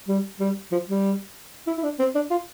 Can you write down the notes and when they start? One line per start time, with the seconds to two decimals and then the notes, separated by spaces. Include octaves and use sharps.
0.08 G3
0.40 G3
0.72 F3
0.88 G3
1.67 E4
1.78 E4
1.83 D4
1.99 C4
2.15 D4
2.31 F4